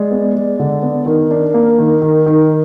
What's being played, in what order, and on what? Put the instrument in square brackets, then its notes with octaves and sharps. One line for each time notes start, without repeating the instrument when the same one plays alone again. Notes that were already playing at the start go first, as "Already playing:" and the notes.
Already playing: [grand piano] G#3 [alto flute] D5
[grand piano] B3
G#3
D3
B3
[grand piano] D#3 [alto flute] A#4
[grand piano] D4
A#3
D#3
D#3
D#3